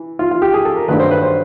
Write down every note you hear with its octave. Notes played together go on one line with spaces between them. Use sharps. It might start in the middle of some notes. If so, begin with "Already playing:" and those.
Already playing: E3
F4
F4
G4
G#4
A4
A#4
G2 D#3 F#3 A3 B4
C5
B4
C5